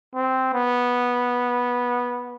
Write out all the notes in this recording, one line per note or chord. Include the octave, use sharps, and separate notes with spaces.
C4
B3